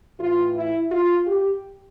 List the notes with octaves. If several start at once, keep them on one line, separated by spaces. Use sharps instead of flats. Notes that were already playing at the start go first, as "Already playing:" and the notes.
A2 E3 F4
E4
F4
G4